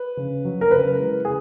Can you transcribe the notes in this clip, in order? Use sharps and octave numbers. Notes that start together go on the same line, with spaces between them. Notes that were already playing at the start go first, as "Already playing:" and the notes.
Already playing: B4
C#3
F#3
A#4
C#3 B4
E3 G#3
C#3 G#4